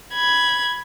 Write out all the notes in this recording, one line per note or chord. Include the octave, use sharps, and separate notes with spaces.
B5 G#6